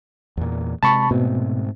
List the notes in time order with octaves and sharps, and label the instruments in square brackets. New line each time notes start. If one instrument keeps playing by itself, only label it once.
[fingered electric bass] E2 A#2
[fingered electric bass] C3 G#3 [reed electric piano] A5 B5 C#6
[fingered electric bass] G#2 A3 C4 [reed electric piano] B2